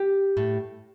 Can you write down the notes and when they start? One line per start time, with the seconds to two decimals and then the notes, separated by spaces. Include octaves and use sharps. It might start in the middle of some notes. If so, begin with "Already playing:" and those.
Already playing: G4
0.37 A2